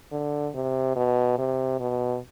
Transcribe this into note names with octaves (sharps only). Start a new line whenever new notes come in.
D3
C3
B2
C3
B2